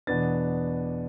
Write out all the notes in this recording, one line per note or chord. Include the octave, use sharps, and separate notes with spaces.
E2 B2 B3 D4 A6